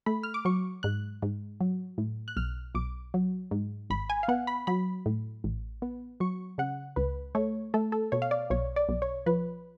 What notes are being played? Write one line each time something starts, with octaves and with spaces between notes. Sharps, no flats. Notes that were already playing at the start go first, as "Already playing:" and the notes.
A3 B5
F6
D6
F#3 C#6
G#2 F#6
G#2
F#3
A2
F#6
B1 F6
B1 D6
F#3
G#2
G#1 B5
G#5
F5
B3 F#5
B5
F#3 B5
A2
A1
B3
F#3 C#6
C#3 F#5
C#2 B4
A3 C#5
A3 A4
A4
B2 C#5
F5
D5
B1 C#5
D5
B1
C#5
F3 B4